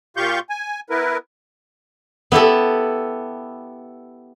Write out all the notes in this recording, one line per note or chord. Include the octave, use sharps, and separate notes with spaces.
A#2 F4 G4 F5 C#6 G6
G#5
B3 E4 A#4 B4
B3 E4 G4 A4